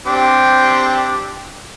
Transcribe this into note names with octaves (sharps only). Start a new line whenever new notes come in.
C4 D4 G4